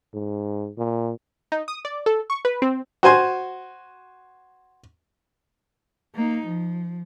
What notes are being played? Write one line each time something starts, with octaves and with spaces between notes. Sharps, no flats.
G#2
A#2
D#4
D#6
D5
A4
C#6
B4
C4
F#4 C5 G#5 C6
A#3 D#4
F3